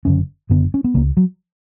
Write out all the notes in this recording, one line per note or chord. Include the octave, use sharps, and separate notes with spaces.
F#1 F#2 D3 C#4
F#1 F#2 D3 B3
C#4
B3
C#2 C#3 A#3
F#3